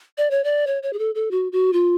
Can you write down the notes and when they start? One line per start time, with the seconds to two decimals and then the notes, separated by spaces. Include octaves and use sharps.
0.18 D5
0.31 C#5
0.44 D5
0.67 C#5
0.83 C#5
0.93 G#4
0.99 A4
1.15 A4
1.31 F#4
1.52 F#4
1.73 F4